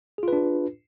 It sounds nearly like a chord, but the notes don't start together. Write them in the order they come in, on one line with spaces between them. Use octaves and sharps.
G#4 F4 B4 D4